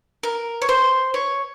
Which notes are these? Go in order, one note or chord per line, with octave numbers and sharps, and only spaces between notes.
A#4
C#5
C5
C#5